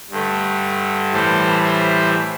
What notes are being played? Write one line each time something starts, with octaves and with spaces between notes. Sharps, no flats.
G2 D3 A3
A2 E3 G3 A4 C5
C5 E5